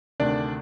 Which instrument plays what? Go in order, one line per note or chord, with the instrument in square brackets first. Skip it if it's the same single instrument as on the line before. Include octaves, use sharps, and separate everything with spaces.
[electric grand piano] D2 C3 D#3 D4 D5